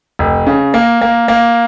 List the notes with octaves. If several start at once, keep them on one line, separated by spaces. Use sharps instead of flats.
F1
C#3
A#3
A#3
A#3